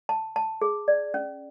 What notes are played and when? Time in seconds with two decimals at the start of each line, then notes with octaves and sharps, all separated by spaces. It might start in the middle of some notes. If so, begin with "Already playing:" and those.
0.09 A5
0.36 A5
0.62 G#4
0.88 D5
1.14 C#4